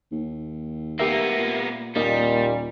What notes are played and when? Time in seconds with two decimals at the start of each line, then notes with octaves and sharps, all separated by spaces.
0.12 D#2
1.00 A#3 B3 G4 A#4 E5
1.38 A#2
1.96 D#1 A#2 G3 A#3 D#4 D#5